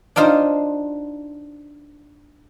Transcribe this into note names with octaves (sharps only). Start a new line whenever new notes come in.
D4 D#4 F4 C5